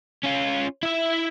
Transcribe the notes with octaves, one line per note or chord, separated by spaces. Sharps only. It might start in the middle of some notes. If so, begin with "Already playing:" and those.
C#4 F4
E4 E5